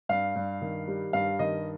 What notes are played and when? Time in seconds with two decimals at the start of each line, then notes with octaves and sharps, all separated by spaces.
0.09 G2 F5
0.36 G2
0.62 D#3
0.88 G3
1.13 G2 F5
1.39 D#3 D#5